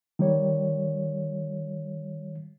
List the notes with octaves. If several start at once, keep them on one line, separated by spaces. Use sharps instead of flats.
D#3 G3 C#5